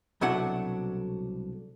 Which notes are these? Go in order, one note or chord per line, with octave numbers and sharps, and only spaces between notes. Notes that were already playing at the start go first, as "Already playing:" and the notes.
C2 B2 F#3 A3 D4 F#5